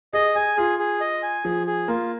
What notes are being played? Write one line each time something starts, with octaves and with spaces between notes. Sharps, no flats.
G#4 D#5
G#4 G#5
F4 G#4
G#4
D#5
G#5
F3 G#4
G#4
A#3 F4